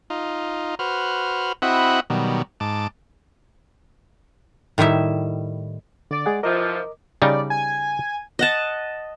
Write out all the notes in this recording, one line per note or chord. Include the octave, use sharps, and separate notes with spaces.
D#4 F4
F#4 B4 C5 F6
C4 E4 F#4 D#5 F#5 B5
B2 D#3 F#3 G3
G#2 A5 D6
A2 D#3 G3 E4 E5
D3 D5
G#3 G#4 F#5
C3 E3 F3 A#4 D#5 D6
C#3 G3 D#4 D5
G#5
D#5 F#5 A5